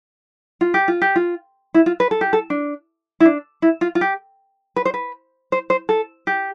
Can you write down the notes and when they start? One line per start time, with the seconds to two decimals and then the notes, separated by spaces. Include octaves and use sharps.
0.61 F4
0.74 G4
0.88 F4
1.02 G4
1.16 F4
1.74 E4
1.86 F4
2.00 B4
2.11 A4
2.21 G4
2.33 A4
2.50 D4
3.20 E4
3.25 D4
3.62 E4
3.81 F4
3.95 F4
4.01 G4
4.76 B4
4.85 C5
4.94 B4
5.52 C5
5.70 C5
5.89 A4
6.27 G4